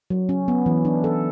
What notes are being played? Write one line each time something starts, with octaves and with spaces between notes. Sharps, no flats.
F#3
C#4
B3
E3
D4
A4